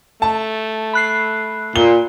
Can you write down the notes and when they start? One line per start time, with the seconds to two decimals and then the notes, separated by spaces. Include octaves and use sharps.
0.22 A3 A5
0.93 B5 F#6 C7
1.76 A#2 G7